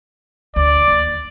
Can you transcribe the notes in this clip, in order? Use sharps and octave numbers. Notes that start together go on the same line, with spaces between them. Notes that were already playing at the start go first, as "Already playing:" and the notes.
D2 D5
D#2